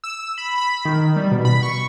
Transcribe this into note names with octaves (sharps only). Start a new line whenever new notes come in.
E6
B5
B5
D#3
G3
B2
B5
C#6